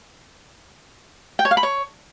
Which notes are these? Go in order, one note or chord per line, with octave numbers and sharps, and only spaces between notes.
G5
C#5
F5
B5
C#5